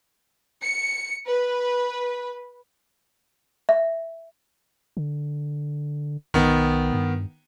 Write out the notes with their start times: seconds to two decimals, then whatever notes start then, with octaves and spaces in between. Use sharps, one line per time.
0.63 C#7
1.29 B4
3.69 E5
4.97 D3
6.34 B1 D#3 B3
6.93 G2